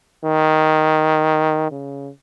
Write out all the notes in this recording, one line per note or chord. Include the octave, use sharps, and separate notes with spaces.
D#3
C#3